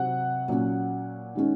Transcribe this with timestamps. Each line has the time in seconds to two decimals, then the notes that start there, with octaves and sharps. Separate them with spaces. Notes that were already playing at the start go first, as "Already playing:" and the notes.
Already playing: C3 F#3 C4 F#5
0.48 A#2 F#3 C#4
1.35 D#3 G#3 C#4